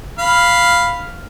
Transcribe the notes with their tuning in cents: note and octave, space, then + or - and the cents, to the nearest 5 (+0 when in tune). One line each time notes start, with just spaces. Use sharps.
F5 +0 B5 +0